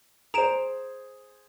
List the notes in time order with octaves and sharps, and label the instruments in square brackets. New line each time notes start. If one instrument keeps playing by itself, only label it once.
[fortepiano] G#4 C5 [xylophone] A#5 D7 E7